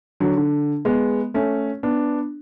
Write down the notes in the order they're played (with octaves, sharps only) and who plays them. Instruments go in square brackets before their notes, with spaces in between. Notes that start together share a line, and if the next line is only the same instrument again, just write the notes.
[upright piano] D3 F#3
D3
G#3 B3
A3 C#4
B3 D4